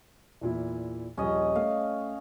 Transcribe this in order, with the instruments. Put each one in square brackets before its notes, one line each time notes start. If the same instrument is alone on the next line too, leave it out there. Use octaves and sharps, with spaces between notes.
[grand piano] E2 A#2 E4
[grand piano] D#1 A#1 [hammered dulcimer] C#4 D#5
[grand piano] A3 [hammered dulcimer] F5